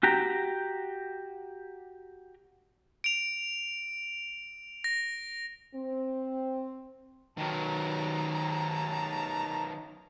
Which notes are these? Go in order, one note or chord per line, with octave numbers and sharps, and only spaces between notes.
F#4 G4 G5 A#5
D7 F7
A#6
C4
D#3 F#3 A5 A#5